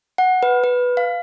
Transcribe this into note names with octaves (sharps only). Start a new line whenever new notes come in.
F#5
B4
B4
F5